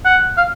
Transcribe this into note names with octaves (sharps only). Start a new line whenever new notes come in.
F#5
F5